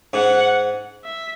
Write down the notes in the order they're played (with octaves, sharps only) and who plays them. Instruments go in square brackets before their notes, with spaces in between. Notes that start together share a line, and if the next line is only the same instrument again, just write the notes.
[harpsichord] G#2 [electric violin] F#5
[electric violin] E5